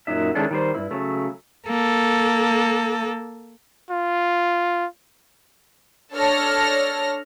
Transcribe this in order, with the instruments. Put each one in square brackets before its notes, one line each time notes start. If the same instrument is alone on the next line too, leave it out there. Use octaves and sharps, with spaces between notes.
[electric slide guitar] F#2 A#2 F#3 D#4 E5
D#3 G#3 C#4 D4 E4 A4
D#3 G3 C5
G2 A#2 E4
C#3 F#3 A3
[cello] A#3 A4
[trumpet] F4
[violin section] D4 A4 C#5 F6 A#6